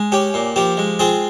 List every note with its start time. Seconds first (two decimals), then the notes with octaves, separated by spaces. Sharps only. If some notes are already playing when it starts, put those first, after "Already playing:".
Already playing: G#3
0.12 C#4 G4
0.34 A#2
0.56 F3 G4
0.77 G#3
0.99 C4 F4 G#4